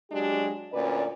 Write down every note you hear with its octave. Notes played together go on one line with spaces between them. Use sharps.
F#3 G#3 D4 G4
D2 A#2 C#4 B4 D5